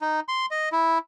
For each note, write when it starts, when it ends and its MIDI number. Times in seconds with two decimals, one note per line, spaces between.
0.01 0.20 63
0.28 0.46 84
0.51 0.69 75
0.72 0.98 64